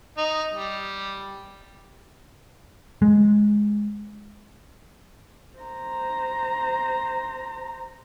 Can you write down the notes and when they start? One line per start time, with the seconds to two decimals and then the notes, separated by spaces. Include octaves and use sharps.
0.18 D#4
0.54 G3
3.02 G#3
5.58 C5 A#5